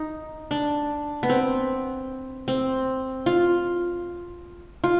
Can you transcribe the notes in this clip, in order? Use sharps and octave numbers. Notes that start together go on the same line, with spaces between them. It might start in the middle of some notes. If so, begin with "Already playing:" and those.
Already playing: D#4
D4
B3
C4
C4
F4
F4